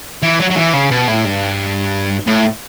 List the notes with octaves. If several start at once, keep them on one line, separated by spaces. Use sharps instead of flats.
E3
F#3
F#3
E3
C#3
B2
A2
G2
A2